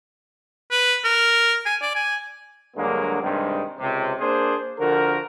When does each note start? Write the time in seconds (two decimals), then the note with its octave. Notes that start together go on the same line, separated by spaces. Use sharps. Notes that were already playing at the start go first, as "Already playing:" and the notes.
0.71 B4
1.04 A#4
1.66 G#5
1.82 D5
1.95 G#5
2.76 G2 D3 F#3 G#3 A#3
3.22 G2 C3 D#3 G3 G#3
3.79 C#2 C3
4.19 A#3 D4 G#4 C5
4.79 D3 F3 F#4 A#4